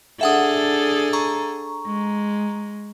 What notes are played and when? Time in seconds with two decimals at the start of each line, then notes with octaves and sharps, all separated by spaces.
0.21 D4 G#4 A4 E5 F#5 D#6
1.13 A#5 C#6
1.86 G#3